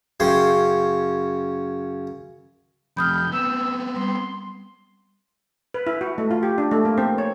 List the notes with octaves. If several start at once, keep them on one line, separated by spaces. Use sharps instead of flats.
F#2 C#3 C#4 G5 C6
F2 C3 B5 D#6 F6 G6
B3 C4 E6
G3 C6
B4
E4
F#4
A3
F4
G4
D4
A3
A#3
C4
C#5